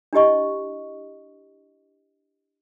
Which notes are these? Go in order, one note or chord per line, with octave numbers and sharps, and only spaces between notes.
D4 E4 G4 D#5 C#6